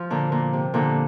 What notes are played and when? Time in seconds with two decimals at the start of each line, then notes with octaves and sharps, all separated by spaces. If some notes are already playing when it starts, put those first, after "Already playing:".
Already playing: F3
0.10 A#2 D3
0.32 A#2
0.53 C3
0.74 A#2 D3